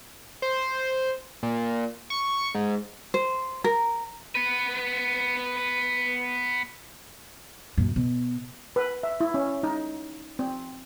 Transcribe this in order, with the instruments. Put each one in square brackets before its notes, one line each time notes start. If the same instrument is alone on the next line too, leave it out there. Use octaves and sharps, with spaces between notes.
[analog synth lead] C5
A#2
C#6
G#2
[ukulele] C5
A#4
[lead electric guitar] B3 B4
[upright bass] F#2 A#2
B2
[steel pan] B4
E5
E4
C#4
D#4
C4